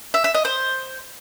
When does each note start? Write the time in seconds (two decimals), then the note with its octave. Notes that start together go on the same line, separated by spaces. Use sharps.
0.14 E5
0.24 E5
0.34 D#5
0.45 C5